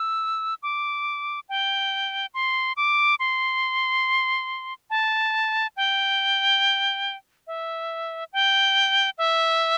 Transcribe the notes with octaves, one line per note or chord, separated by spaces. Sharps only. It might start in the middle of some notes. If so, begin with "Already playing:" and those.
Already playing: E6
D6
G5
C6
D6
C6
A5
G5
E5
G5
E5